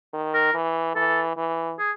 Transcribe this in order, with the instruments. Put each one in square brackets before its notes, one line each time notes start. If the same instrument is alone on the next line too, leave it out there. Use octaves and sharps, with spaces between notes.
[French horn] D#3
[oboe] A#4
[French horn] E3
[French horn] E3 [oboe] A4
[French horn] E3
[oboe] G#4